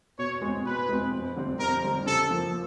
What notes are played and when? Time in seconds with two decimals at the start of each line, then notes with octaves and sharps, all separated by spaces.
0.19 B2 C#5
0.42 G#3 C4
0.65 B2 B4
0.89 G#3 C4
1.13 F2
1.36 D3 G3 C4
1.59 F2 A#4
1.83 D3 G3 C4
2.06 C#3 A4
2.31 F3 A#3